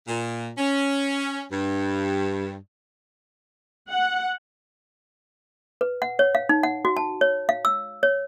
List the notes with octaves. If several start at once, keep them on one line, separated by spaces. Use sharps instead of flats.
A#2
C#4
G2
F#5
B4
F#5
C#5
F5
D#4
F#5
F#4
A5
C#5
F5
E6
C#5